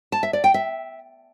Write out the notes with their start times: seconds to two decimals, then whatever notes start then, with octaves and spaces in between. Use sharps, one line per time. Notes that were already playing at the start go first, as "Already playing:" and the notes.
0.12 A5
0.23 E5
0.33 D5
0.44 G5
0.54 E5